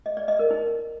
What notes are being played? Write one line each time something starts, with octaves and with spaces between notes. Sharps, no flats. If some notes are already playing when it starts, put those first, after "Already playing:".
D#5
D5
D#5
A#4
D#4